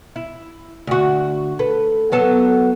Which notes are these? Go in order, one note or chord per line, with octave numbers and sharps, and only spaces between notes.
E4
D2 F#4
A4 B4
F#3 B3 A4